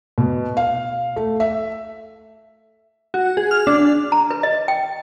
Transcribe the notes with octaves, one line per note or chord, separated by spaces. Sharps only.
B2
F5
A3
E5
F#4
G#4
F6
D4
A#5
B4
D#5
G5